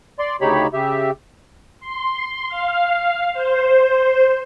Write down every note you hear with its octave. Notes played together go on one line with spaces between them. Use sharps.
D5 C6
D2 C#3 D#4 G4 C#5 B5
C#3 G4 E5
C6
F5
C5